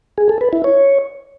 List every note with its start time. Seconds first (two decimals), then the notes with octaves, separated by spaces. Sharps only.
0.18 G#4
0.29 A4
0.41 B4
0.53 E4
0.64 C#5